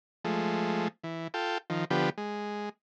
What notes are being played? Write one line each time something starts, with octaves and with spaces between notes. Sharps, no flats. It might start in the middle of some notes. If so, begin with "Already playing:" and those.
F3 G#3 A3
E3
F4 A4 G5
D#3 F3
D3 F3 B3 G4
G#3